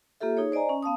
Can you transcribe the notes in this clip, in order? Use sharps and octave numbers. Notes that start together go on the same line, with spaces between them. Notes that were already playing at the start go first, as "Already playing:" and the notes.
A#3 F4 G4 A4 E5
D#4 G#4 C#5
C5 D5 D#5 G#5 A#5
C#4
B3 F5 A5 D#6